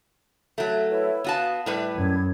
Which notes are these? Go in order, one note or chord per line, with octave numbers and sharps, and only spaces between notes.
F#3 A3
E4 B4 C#5
B3 F#4 F5 A5 D#6
A2 G3 B4 E5
F#2 G#6